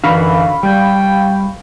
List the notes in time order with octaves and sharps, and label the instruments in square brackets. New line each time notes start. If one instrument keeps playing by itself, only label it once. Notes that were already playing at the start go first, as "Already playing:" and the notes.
[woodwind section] F#2 E3 [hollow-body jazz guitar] D3 D#4 F#4 [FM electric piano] F5 B5 C#6
[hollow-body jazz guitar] G3 [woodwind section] G5